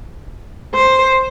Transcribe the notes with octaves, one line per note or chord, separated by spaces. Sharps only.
C5